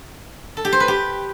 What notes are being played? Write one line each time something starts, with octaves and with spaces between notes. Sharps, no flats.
A4
G4
C5
B4
G4